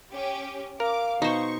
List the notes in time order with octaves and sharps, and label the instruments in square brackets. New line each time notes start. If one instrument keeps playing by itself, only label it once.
[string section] C#4 G4
[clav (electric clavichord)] A#4 [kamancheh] F5 [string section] D6
[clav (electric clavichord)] B2 [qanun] D#4 C5 [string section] C#6